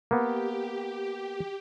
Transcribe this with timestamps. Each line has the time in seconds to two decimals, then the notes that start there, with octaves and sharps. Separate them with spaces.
0.11 A#3 B3 G4